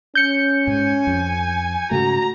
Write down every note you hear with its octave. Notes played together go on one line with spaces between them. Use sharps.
C#4 G6 C#7
G#2 G#5
F2
G#2 C#3 A3 F#4 A#5